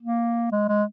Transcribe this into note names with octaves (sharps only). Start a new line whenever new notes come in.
A#3
G#3
G#3